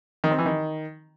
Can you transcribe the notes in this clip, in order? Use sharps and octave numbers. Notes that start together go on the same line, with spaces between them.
D#3
C4
E3
D#3